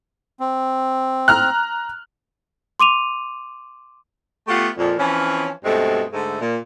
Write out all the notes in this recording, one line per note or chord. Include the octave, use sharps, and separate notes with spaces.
C4
A#5 F6 F#6
C6 D6 D#7 F7
A3 B3 F4 G4 F#5
F2 A#2
E3 F3 C4 C#4
G2 B2 G#3 A3 C4
G#2 D3 A3
A#2